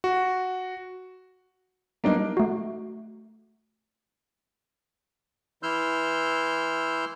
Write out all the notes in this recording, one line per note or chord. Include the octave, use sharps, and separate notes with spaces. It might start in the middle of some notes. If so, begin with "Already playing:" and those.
F#4
F#3 G3 A#3 B3 D4 D#4
A3 F#4
E3 E4 C6 E6 F6 G6